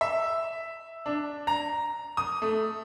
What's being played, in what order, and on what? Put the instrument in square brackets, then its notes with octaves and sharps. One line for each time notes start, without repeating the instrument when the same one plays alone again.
[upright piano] E5
D4
A#5
D#6
A3